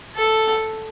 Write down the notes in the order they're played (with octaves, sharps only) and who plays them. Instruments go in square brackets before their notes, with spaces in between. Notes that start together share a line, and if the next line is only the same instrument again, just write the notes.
[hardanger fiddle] A4